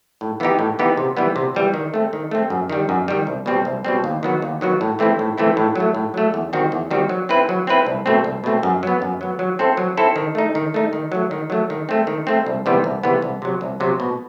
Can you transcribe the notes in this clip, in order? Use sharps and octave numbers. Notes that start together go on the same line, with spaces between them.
A2
E3 B3 D#4 G4
A2
E3 B3 D#4 G4
C3
E3 G3 B3
C3
E3 G3 B3
D#3
A3 C4
D#3
A3 C4
F#2
D#3 G3
F#2
D#3 G3
C2
B2 G3 C4
C2
B2 G3 C4
D#2
D#3 F#3 B3 F#4
D#2
D#3 F#3 B3 F#4
A2
E3 A3 C4 E4
A2
E3 A3 C4 E4
A2
F#3 A3
A2
F#3 A3
E2
D#3 G3 C4 F#4
E2
D#3 G3 C4 F#4
F#3
C4 E4 B4
F#3
C4 E4 B4
C2
B2 A3 C4
C2
B2 A3 C4
F#2
F#3 B3
F#2
F#3 B3
F#3
C4 E4 A4 C5
F#3
C4 E4 A4 C5
D#3
A3 D#4
D#3
A3 D#4
D#3
F#3 A3
D#3
F#3 A3
D#3
A3 C4
D#3
A3 C4
C2
C3 E3 G3 B3
C2
C3 E3 G3 B3
C2
C3 F#3
C2
C3 F#3
B2